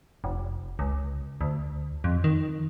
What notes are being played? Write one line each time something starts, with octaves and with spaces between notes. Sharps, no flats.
F1
C#2
D2
F2
D#3